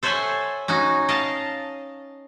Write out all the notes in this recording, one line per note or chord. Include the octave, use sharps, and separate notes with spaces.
A4 C5 C#5 E5 F#5 G#5
C#4 D#4 F#4
D#5 F5 A5